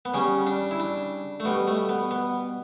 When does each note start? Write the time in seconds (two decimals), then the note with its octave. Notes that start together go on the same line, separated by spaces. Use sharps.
0.05 B3
0.14 C#3 G3 C#4
0.47 D4
0.71 E4
0.80 D4
1.40 A3
1.45 B2 G3 B3
1.68 A3
1.89 B3
2.11 B3